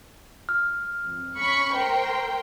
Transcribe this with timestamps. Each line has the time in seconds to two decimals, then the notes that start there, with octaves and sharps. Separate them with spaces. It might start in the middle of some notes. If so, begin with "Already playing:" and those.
0.49 F6
1.06 F2
1.39 C#4 B5 C#6
1.73 A#4 C5 G5